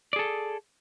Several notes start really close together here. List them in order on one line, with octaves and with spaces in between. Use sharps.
D5 G#4 A4